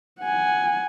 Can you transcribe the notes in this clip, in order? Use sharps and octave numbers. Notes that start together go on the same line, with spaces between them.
F#5 G#5